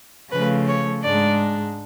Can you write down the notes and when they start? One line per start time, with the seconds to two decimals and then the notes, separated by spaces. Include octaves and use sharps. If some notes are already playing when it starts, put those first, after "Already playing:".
0.32 C#3 F3 A3 B4
0.68 C#5
1.03 G#2 G#3 D4 D5